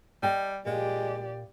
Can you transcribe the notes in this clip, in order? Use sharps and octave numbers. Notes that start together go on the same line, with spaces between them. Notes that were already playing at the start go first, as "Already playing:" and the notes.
G3 D#5 G5 A5
A#2 G#3 G4 D5